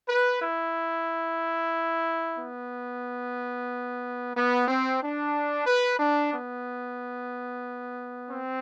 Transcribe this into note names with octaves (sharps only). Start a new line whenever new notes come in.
B4
E4
B3
B3
C4
D4
B4
D4
B3
C4